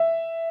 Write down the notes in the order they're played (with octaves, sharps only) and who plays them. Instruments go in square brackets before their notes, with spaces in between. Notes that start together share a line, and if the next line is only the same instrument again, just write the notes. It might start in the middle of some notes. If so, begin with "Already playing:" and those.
Already playing: [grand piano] E5